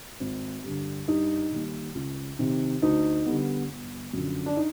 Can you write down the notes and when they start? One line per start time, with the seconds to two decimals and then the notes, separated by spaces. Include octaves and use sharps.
0.20 G#1
0.64 G2 D3
1.08 G2 D#4
1.52 D#3 G3 A#3
1.95 C#2
2.39 C3 D#3
2.82 D2 D#4
3.26 D3 G3 B3
3.69 G1
4.13 F#2 D3 F3
4.46 D4
4.57 D#4